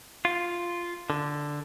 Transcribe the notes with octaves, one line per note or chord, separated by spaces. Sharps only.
F4
D3